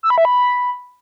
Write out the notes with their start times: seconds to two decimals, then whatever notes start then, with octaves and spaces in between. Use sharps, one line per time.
0.03 E6
0.10 B5
0.18 E5
0.25 B5